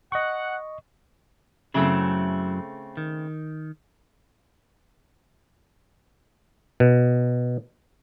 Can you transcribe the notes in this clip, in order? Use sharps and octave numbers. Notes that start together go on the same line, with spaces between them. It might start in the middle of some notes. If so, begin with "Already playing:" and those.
D#5 F#5 C#6
F#2 C#3 F#3 A3 C4 E4
D#3
B2